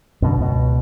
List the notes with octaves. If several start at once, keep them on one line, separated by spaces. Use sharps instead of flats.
F#2 B2 D3
C#2 B2